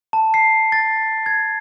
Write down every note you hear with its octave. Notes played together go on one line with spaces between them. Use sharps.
A5
C7
A6
G#6